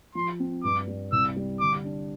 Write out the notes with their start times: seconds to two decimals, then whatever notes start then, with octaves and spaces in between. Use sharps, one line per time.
0.15 F3 C6
0.40 C4
0.64 G2 D6
0.88 G3
1.12 C2 E6
1.37 G3
1.60 D3 D6
1.85 D4